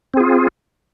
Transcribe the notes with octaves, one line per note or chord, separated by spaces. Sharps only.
C4 F4 G#4